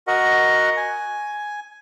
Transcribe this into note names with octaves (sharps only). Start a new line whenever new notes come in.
F#4 A#4 D#5 F#5
G#5